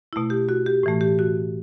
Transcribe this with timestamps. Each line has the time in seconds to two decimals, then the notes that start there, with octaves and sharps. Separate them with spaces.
0.13 B2 A3 E4
0.30 G4
0.49 F#4
0.66 G4
0.83 A2 E3 A3
1.01 G4
1.19 F#4